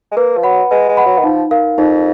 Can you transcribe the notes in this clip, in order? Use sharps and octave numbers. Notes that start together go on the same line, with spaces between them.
G#3
A#3 B4
F3
F#3 F#5 B5
G#3 B4
G#3
F#5 B5
F#3
D#3
F3 D#4
A#4 F5
F2 D#4